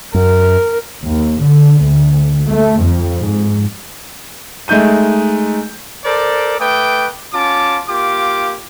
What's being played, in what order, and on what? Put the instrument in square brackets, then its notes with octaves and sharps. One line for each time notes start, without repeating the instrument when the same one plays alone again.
[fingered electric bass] F#2 [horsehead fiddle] A#4
[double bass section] D#2
D3
D2
A3
F2
G#2
[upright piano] G#3 A3 D#4 G6 D#7
[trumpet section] A4 A#4 C5 D5
A3 B4 G5 D6 D#6
C#4 F4 A5 D6
A#3 F4 G4 D6